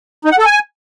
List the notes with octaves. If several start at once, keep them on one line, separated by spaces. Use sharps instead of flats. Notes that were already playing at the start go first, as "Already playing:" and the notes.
D#4
F#5
A4
G#5